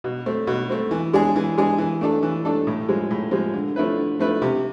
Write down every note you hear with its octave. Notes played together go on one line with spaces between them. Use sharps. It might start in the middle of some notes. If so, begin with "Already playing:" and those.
B2
A3 C4
B2
A3 C4
E3
G#3 D4 G#4
E3
G#3 D4 G#4
E3
A3 D4 A4
E3
A3 D4 A4
A2
F3 G#3
A2
F3 G#3
D3
F3 A3 E4 B4
D3
F3 A3 E4 B4
C3